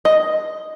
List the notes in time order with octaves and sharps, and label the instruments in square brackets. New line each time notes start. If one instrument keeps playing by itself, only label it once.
[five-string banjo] D#5